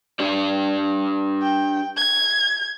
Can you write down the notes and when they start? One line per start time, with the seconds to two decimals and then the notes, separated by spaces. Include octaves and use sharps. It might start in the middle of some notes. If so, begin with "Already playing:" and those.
0.20 D4 G4 D5
1.42 G5
1.97 G#6